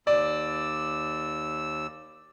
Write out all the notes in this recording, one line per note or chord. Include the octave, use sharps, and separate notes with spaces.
D#2 D5 E6